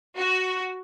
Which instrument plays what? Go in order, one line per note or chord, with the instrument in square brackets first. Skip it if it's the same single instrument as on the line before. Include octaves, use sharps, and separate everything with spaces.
[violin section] F#4